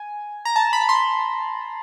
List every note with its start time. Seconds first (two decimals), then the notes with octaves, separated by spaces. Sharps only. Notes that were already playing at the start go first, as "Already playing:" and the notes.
Already playing: G#5
0.45 A#5
0.56 A5
0.73 B5
0.89 C6